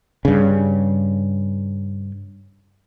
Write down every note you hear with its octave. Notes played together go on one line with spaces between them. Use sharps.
G2 C#3